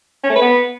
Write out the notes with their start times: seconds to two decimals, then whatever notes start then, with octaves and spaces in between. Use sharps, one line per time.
0.23 C#4
0.29 A3
0.35 B4
0.41 B3